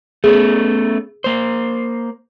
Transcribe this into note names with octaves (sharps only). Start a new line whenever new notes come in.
A3 B3 C#4 G#4
A#3 C5